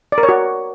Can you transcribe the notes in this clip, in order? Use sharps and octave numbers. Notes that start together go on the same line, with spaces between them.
D5
A#4
C#5
F#4